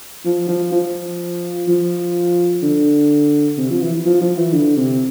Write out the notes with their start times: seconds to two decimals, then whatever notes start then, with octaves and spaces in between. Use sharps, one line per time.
0.25 F3
0.49 F3
0.72 F3
1.68 F3
2.62 D3
3.57 C3
3.70 F3
3.81 E3
4.05 F3
4.21 F3
4.37 E3
4.53 D3
4.77 C3